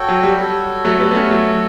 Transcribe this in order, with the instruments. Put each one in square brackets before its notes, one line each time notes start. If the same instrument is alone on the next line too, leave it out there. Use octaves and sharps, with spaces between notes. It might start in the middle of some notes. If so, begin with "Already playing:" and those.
Already playing: [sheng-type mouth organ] F#4 A4 C#5 G5
[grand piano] F#3
G3
[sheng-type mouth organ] F#4 A4 C#5
[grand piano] F#3 A3
A3
G3 B3
B3
A3 C#4
F#3 A3